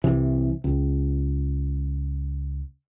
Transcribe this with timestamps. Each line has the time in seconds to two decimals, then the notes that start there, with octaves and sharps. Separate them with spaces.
0.04 C2 C3 E3
0.64 C#2